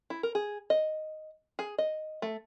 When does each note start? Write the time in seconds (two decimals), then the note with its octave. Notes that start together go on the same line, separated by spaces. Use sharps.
0.10 E4
0.23 A#4
0.35 G#4
0.70 D#5
1.59 G#4
1.78 D#5
2.22 A3